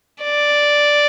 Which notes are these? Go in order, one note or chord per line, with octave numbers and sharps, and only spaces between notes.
D5